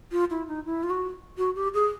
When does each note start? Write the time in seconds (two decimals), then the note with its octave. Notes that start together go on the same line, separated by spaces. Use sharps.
0.12 F4
0.30 E4
0.48 D#4
0.66 E4
0.83 F4
0.90 F#4
1.38 F#4
1.56 G4
1.74 G#4